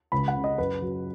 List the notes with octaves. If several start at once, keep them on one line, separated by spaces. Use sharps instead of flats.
C#2 B5
F#5
C#3
D#5
F#2 B4
F#3